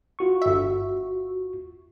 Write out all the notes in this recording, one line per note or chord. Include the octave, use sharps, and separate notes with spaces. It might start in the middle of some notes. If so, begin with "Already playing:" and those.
F4 F#4 C#6
G1 E5